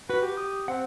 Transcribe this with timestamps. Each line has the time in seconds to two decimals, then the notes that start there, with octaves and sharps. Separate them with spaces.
0.10 F#4 B4
0.22 G4
0.37 D#6
0.68 C4 F#5